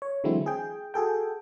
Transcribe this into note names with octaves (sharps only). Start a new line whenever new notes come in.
C#5
D3 E3 F#3 G#3 C4 E4
G#4 G5
F#4 G#4 A4 G5